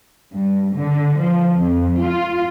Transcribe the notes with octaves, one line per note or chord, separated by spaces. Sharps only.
G2
D3
F3
F2
F4